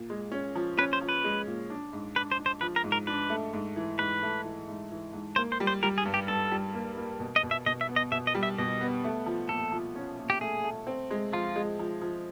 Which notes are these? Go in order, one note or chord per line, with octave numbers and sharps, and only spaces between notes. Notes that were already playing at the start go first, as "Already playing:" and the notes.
Already playing: A#2
G#3
C#4
F3
C#4 B4
C5
F3
B4
G#3
A#2
D4
G#2
D4 B4
C5
D4
C5
F3 B4
A#4
G#2
A#4
D4 B4
A3
G#2
E3
G#2 B4
A3
E3
G#2
E3
G#2
A#3 C5
C5
G3
C5
G3 A#4
G#4
G2
G4
G2 A4
G3
A#3
A#3
B2
D#5
B2
E5
B2 D#5
E5
B3
D#5
B2 E5
D#5
G3
E5
B2 D#5
B3
A3
F3
A#2 A4
F3
C#4
A#2
G4
A3 G#4
A3
C4
G#3
F3 F4
G#3
F3
F3